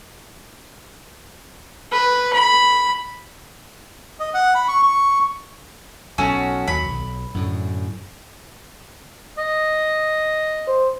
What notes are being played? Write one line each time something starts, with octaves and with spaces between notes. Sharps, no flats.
B4
B5
D#5
F#5
B5
C#6
C#6
B1 C#4 F#4 A4
D#2 F#3 B5
B1
F#2 A2 D3
D#5
C5